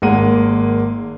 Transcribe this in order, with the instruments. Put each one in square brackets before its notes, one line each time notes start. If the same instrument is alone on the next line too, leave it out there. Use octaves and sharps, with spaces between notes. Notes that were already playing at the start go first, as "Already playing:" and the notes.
[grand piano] G#1 G#3 A#3 F#5 D#7